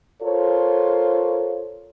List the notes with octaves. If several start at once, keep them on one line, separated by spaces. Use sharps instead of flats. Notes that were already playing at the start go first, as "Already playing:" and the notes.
F4 A4 A#4 C5 C#5